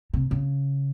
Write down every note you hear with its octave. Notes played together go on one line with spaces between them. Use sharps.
C3
C#3